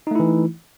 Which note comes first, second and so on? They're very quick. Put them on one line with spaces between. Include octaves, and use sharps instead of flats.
D#4 A3 E4 E3